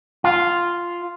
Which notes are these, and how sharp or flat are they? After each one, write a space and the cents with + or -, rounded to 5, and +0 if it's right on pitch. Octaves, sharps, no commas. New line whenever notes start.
F4 -5